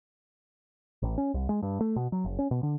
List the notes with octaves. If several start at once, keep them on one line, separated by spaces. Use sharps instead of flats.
A1
C#4
C2
G#3
G2
A3
B2
F#3
F#1
C#4
B2
D3